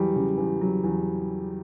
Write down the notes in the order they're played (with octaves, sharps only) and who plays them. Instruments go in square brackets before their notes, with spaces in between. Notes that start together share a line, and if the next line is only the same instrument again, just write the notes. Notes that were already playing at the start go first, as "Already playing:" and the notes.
Already playing: [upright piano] E2 F#3 [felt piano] G3
[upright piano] C#3
E2
F#3
E2